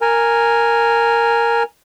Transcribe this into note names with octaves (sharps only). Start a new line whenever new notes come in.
A#4 G#5